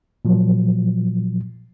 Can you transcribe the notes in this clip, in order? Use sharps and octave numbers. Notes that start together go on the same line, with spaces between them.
A#2 F3 F#3